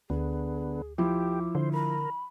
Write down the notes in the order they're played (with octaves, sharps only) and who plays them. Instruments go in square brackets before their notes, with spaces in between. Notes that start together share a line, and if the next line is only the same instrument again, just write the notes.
[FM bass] D2 [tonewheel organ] D3 B3 [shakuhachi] G#4
[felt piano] F3 E4 [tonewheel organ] G4 [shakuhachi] D6
[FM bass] D3 [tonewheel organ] C5
[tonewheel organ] A#4 [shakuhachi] B5